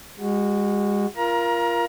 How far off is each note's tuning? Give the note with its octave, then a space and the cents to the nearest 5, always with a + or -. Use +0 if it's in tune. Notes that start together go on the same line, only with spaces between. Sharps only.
G#3 -35 F#4 +0
F4 -20 A#4 +15 A#5 +30